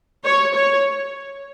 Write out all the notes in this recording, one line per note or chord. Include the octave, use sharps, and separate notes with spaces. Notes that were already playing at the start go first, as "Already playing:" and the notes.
C#5
C#5